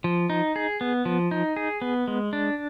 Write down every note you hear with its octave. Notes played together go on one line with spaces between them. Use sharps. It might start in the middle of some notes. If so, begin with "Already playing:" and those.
F3
D#4
G#4
B3
F3
D#4
G#4
B3
G#3
D4